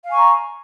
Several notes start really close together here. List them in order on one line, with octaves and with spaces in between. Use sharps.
F5 G#5 C#6 A#5